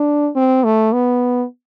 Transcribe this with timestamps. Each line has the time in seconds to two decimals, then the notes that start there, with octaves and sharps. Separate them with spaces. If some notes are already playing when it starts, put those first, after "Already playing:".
Already playing: D4
0.36 C4
0.64 A3
0.93 B3